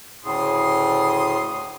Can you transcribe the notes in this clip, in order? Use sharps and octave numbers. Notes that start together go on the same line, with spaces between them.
D2 A2 C#3 C6 D#6